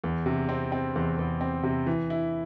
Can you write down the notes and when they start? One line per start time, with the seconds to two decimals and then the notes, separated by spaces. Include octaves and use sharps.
0.04 E2
0.26 C3
0.49 C4
0.72 C4
0.96 E2
1.19 E2
1.41 C4
1.63 C3
1.87 E3
2.10 E4